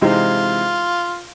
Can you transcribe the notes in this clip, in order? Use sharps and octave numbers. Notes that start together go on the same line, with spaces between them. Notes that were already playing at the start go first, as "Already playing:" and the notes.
C3 E3 G#3 C4 D#4 F4